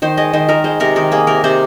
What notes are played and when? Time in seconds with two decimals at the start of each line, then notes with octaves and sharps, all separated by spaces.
0.02 D#3 C5
0.17 G#3 D#5
0.33 D#3 C5
0.49 D#3 A#4
0.64 G#3 C5
0.80 C3 A#4
0.96 D#3 A#4
1.12 A#3 G#4
1.27 C3 A#4
1.44 C3 C5